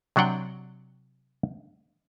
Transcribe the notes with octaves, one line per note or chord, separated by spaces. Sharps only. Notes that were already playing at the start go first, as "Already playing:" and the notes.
C3 F#3 D4 F#5 G5